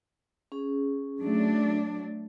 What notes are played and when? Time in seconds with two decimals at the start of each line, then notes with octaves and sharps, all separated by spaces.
0.52 C#4 G#4
1.22 F#3 A3 D4